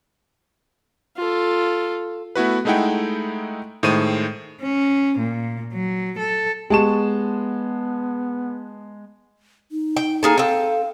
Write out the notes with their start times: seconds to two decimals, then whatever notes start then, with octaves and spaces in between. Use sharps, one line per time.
1.17 F4 A4
2.35 A3 B3 E4 F#4 B4
2.65 G#3 A3 D#4 E4 F#5 G5
3.83 A2 D#3 G#3 C5 D#7
4.62 C#4
5.19 A#2
5.73 F#3
6.19 A4
6.70 G#3 B3 G4 G#4 A5 C#6 E7
9.72 D#4
9.97 G5
10.23 A#3 G#4 A4
10.38 C4 A4 F5